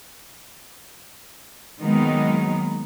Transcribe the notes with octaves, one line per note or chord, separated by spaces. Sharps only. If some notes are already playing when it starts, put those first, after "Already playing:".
D#3 F#3 G#3 A#3 B3 D#4